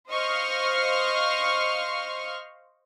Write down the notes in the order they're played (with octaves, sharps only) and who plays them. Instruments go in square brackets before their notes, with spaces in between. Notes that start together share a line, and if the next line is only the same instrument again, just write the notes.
[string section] C5 D#5 F5 C#6 F6